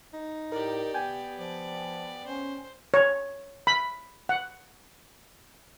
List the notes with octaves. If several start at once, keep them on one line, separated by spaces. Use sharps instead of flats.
D#4
A2 G4 A#4 D5
C3 B3 G5 G#5
F3 D5
C#4 C5
C#5
B5
F#5